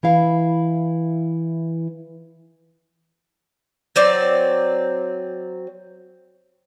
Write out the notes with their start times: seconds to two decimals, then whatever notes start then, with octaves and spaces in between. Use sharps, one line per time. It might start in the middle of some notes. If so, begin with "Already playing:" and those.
0.03 E3 E4 F5
3.96 F#3 C4 D5